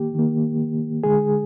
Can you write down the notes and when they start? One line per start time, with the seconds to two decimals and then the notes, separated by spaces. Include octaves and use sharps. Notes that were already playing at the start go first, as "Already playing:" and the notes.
Already playing: D#3 A#3 G4
0.15 D#3 A#3
1.04 D3 G#3 G#4